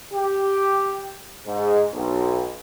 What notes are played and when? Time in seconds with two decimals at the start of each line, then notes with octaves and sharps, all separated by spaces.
0.14 G4
1.47 G#2
1.94 B1